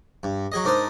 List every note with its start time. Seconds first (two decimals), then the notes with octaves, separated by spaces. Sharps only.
0.23 G2
0.52 F#3 G#4 D#5
0.64 G#2 D4 A#4 C5 D#6